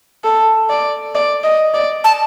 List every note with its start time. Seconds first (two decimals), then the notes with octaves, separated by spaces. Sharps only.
0.24 A4
0.70 D5
1.15 D5
1.44 D#5
1.74 D5
2.04 A5